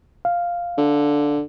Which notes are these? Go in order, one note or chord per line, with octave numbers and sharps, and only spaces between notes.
F5
D3